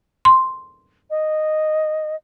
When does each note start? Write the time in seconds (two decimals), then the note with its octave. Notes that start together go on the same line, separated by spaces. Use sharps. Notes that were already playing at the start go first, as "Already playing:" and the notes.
0.25 C6
1.10 D#5